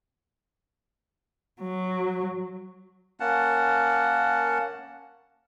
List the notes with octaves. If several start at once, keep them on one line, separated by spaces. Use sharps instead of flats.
F#3
A#3 C#4 F#5 A5